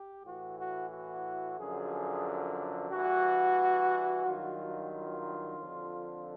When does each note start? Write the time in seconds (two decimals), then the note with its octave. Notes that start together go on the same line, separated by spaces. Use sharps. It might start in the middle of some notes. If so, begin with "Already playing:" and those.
Already playing: G4
0.24 A2 E3 F#4
0.58 F#4
0.91 F#4
1.58 F#2 D3 F3 G#4
2.91 G2 E3 F#4
4.26 G2 D#3 F#3 F4
4.93 F4
5.59 F2 D3 F3